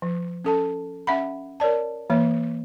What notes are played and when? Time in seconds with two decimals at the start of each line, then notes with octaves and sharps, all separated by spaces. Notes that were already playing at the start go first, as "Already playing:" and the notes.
0.02 F3
0.45 C#4 A4 A5
1.07 C#4 E5 F#5 B5
1.60 A#4 C#5 D5 A5
2.10 E3 A#3 C#5